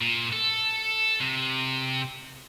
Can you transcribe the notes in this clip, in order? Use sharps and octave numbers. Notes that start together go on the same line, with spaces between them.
A#2
A4
C3